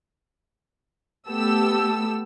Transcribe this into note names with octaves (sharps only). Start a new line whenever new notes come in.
A3 B3 G4 A4 E6